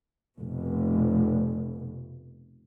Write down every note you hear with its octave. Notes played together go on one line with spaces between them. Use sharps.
F1 B2